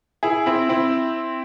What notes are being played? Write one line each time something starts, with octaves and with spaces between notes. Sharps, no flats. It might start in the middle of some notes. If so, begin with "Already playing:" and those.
E4 G#4
C4 E4
C4 E4